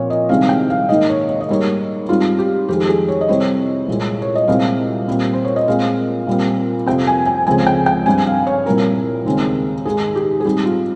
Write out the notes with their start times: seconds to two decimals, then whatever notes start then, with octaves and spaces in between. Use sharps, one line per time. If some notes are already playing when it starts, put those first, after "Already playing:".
Already playing: A#2 F3 C4 C#5
0.10 D#5
0.29 C2 C3 D#3 G#3 C4 F5
0.49 G5
0.70 F5
0.89 G#2 D#3 A#3 D#5
1.10 C#5
1.29 C#5
1.41 D#5
1.49 G#2 G3 A#3 C#5
2.09 G#2 G3 C4 F4
2.38 G4
2.69 F2 D#3 G#3 G4
2.88 G#4
3.08 C#5
3.21 D#5
3.28 C2 C3 G3 C4 C#5
3.88 C2 A#2 G#3
4.22 C#5
4.35 D#5
4.48 C2 A#2 G#3 C4 F5
5.08 A#2 G3 C4
5.33 C5
5.45 C#5
5.56 D#5
5.67 A#2 G#3 C4 F5
6.27 A#2 G3 C4
6.86 F2 C3 F3 C4 G5
7.07 G#5
7.26 G#5
7.47 C#2 C#3 F3 C4 G#5
7.67 G5
7.86 G5
8.06 G2 G3 C4 G#5
8.26 F5
8.47 C#5
8.65 C2 A#2 G3 C4 A#4
9.25 D#2 C#3 G#3 C4
9.85 G#2 D#3 G#3 G#4
10.15 G4
10.40 G#4
10.45 G#2 G3 C4 G4
10.66 F4